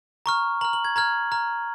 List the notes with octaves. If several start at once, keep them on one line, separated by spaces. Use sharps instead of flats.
A#5 C#6 F6
A#5 F6 F#7
F#7
G#6
A#5 F6 G#6
A#5 F6